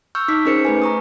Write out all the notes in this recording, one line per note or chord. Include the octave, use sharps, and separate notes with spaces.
C#6 E6 F6 G6
D#4 D6 B6
C#4 D#4 G#4 A#4 C5 C#7
A3 B4 G#5
A#5 C#6 D#6